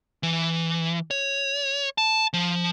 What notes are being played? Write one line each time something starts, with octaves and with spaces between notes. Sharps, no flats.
E3
C#5
A5
F3